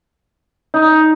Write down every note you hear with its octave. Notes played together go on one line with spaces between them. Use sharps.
D#4